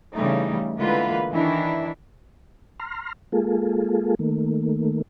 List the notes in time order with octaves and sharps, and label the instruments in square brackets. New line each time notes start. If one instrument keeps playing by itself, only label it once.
[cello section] C#3 E3 G3 A3 D#4
D3 E3 G#3 A#3 F4 B4
D#3 E3 D4 E4
[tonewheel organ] A#5 C6 F6
G#3 A#3 F4 G#4 A4
D#3 A3 A#3